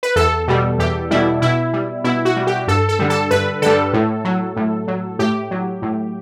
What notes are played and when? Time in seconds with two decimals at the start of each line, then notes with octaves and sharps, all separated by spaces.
0.03 B4
0.16 E2 A4
0.48 B2 G3
0.79 E2 G4
1.11 B2 G3 E4
1.42 B2 E4
1.73 G3
2.04 B2 E4
2.25 F#4
2.36 G3
2.47 G4
2.68 G2 A4
2.89 A4
2.99 D3 G3
3.10 A4
3.31 G2 B4
3.62 D3 G3 A4
3.93 A2
4.25 F#3
4.56 A2
4.88 F#3
5.19 A2 G4
5.51 F#3
5.82 A2